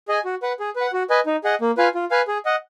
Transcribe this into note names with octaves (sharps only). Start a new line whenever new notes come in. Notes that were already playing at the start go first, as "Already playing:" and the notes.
G#4 D#5 G#5
F#4
B4 F#5
G#4
B4 F#5
F#4
B4 D#5 G#5
D#4
G#4 D#5 F#5
A#3
F4 B4 F5 G#5
F4
B4 F5 G#5
G#4
D#5 F#5